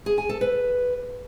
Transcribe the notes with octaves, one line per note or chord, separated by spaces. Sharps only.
G#4
G#5
A4
B4